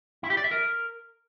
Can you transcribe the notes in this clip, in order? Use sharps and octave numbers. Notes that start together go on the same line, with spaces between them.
E4
G4
D5
E5
A#4